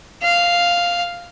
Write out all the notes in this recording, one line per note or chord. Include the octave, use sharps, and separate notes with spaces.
F5